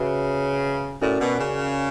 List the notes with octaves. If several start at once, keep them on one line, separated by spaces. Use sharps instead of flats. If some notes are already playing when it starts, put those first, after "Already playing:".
Already playing: C#3 F#4 B4 E5
A2 C#4 F#4 A#4 D5
B2
C#3